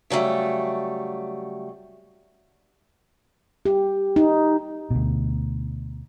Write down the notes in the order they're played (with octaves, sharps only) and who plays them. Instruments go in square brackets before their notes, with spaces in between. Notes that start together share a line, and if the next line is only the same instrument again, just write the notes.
[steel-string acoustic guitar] C#3 F#3 G3 A3
[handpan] G4
D#4
[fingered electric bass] D2 B2